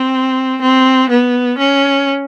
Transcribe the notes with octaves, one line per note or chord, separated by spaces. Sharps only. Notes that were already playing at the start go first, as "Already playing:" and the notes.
Already playing: C4
C4
B3
C#4